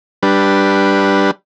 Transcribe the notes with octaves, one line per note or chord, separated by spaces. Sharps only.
G3 D4 B4